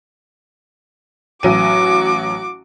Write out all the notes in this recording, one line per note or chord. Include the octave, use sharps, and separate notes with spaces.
A1 F#3 F#4 D6 D#7